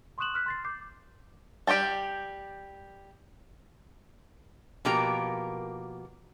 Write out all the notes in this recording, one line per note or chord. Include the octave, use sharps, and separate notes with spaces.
C6 C#6 D#6 F#6 E7 F#7
F6 F#6 B6
C6 A6 C7
D6 G6 C7
G3 G4 C#5 G5 A5
B2 F3 A#3 G4 A#4 A#5